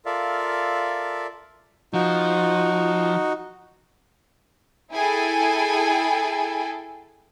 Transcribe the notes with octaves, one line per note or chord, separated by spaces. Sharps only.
F4 A4 A#4 D5 E5 F5
F3 D#4 F#4
E4 G#4 A4 G5 G#5